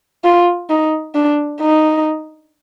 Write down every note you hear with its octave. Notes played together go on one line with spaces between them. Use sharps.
F4
D#4
D4
D#4